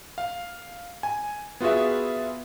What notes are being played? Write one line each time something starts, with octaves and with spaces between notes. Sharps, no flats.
F5
G#5
B3 F4 F#4 G#4 E5